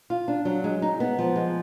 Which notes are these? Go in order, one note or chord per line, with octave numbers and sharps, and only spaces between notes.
F4
D4
F#3
G#3
D#4
B3
F3
G#3